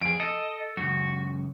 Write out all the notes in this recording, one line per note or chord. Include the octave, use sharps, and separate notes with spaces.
F2 G#4 D7
A4 D#5
C#2 F#2 F#4